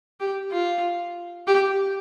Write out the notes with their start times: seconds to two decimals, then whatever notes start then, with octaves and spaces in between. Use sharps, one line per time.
0.20 G4
0.52 F4
1.47 G4